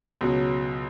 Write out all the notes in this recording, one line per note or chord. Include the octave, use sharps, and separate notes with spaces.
C#2 B2 F#3